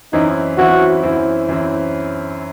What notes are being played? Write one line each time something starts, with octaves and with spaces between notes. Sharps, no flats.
F#2 E3 C4 D#4 E4
F#2 E3 C4 E4 F#4
F#2 E3 C4 E4
F#2 E3 C4 E4